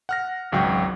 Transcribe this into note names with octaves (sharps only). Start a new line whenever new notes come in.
F#5 F6 A#6
G#1 C#2 F#3 F#4 G5